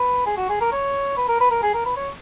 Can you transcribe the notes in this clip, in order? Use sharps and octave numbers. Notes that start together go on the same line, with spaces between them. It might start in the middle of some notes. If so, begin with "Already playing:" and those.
Already playing: B4
G#4
F#4
G#4
A#4
C#5
B4
A#4
B4
A#4
G#4
A#4
B4
C#5